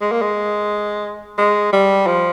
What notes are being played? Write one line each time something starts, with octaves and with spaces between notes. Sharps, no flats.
G#3
A#3
G#3
G#3
G3
F3